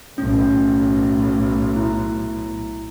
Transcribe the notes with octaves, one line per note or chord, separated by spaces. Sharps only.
B1 A2 C#4
E4